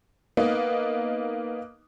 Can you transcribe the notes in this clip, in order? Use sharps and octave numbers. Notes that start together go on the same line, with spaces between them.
A#3 B3 D#4 D#5